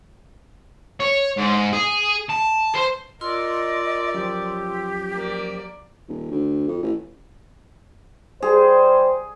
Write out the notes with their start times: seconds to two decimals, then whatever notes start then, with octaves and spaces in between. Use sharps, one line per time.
1.00 C#5
1.37 G#2
1.73 G#4
2.30 A5
2.75 C5
3.21 F4 A#4 D5 D#5 C6 E6
4.15 F#2 F3 G4
5.14 A#3 D5
6.08 D#1
6.32 D2
6.68 F2
6.83 A1
8.42 G3 G#4 C5